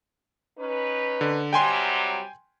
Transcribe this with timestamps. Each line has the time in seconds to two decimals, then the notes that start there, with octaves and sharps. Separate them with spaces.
0.59 C#4 D#4 B4
1.21 D3
1.53 C3 F#3 G3 G5 G#5 C6